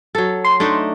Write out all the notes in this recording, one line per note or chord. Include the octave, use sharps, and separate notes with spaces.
F#3 A4
C6
A3 D4 D#4